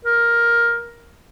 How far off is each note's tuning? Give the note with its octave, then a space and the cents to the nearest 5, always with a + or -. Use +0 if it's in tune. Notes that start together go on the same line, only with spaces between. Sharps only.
A#4 +10